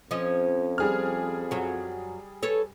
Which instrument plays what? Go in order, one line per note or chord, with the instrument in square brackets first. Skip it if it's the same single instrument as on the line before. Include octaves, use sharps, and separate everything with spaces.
[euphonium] F2 [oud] F3 C#4 D#5
[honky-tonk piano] G3 G#4 F6
[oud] F#2 F#3
A4 B4 C#5